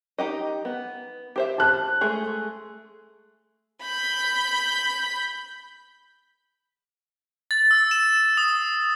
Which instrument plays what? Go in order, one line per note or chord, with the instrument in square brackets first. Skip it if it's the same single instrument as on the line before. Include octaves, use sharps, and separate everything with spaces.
[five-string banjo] D#4 G4 D#5
B3
G4 C5 E5
[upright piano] A5 F#6
[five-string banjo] G#3 A3 G#4
[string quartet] B5 G6
[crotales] A6
E6
E7
D#6